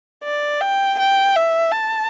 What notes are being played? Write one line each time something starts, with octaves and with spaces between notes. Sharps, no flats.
D5
G5
G5
E5
A5